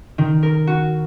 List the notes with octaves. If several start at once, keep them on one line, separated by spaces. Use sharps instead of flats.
D#3
A#4
F#4